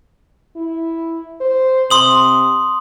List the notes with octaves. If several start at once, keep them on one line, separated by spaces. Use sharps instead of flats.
E4
C5
C3 C6 D#6 F#7